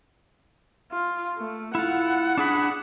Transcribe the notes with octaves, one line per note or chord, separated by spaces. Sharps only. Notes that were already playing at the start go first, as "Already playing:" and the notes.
F4
A3
E4 F4 F#5
D4 G#4 B5